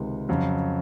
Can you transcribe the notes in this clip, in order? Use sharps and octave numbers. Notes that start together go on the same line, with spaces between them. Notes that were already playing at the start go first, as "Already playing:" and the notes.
Already playing: C#2 C3 D#3 G#3
F2 C#3 F#3